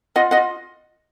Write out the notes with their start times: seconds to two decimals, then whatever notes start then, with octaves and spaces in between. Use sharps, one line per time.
0.16 F4 D#5 F#5
0.31 D#5 F#5
0.37 F4